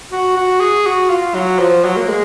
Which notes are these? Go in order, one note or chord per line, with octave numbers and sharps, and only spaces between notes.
F#4
F#4
G#4
F#4
F4
F#3
F3
F#3
A#3
G#3